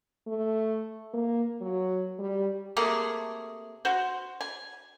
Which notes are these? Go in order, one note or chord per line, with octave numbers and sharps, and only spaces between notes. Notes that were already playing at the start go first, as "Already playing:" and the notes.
A3
A#3
F#3
G3
C3 A3 A#3 G#4
F#4 C5
G#5